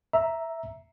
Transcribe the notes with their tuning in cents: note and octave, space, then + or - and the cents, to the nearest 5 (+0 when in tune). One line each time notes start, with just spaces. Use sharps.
E5 +0 A#5 +0